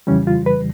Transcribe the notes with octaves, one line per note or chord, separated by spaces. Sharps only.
F2 C#3 E3 G3 C#4
F4
B4